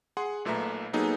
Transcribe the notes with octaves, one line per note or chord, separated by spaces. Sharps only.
G#4 F#5 C6
B1 A#2 A3 B4 E5 A#5
F#3 A#3 B3 D#4 G#4 A4